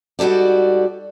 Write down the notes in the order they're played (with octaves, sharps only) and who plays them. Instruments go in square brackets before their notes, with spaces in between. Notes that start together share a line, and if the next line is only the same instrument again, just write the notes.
[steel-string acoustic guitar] G#2 G3 F#4 A4 D5